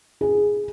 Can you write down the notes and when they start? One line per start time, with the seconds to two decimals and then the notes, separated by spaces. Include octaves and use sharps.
0.21 G#4